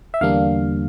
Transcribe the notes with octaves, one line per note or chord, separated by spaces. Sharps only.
E5
E2 D3 G3 A#3 D4 F5